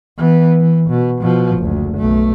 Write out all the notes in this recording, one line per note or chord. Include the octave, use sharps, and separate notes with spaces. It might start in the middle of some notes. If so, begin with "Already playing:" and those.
E3 B3
E3
B2
B2 F3
F#1 D2
B1 A3